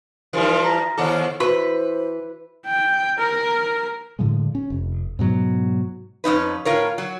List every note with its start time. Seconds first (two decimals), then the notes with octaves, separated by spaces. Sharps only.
0.33 E3 F3 G3 D#4 A#4
0.64 A#5 F6 A#6
0.98 D#2 A4 C5 C#5 D6
1.40 E3 F#4 B4 C5 C#6
2.66 G5
3.19 A#4
4.19 A2 D3 F3 G#3
4.55 C#4
4.70 F1
5.19 G#2 B2 F#3
6.24 F2 C#4 D#4 B4
6.65 A2 F4 A#4 C#5
6.98 F#3